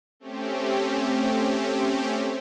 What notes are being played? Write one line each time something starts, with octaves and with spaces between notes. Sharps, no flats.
A3 C4 C#4 G4